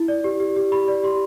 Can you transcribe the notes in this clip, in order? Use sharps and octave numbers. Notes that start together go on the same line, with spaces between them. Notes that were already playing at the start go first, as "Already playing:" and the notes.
Already playing: E4
D5
G4
G4
G4
G4 B5
D5
G4 C6